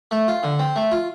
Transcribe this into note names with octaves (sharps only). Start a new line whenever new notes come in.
A3
F4
D3
C4
A3
F4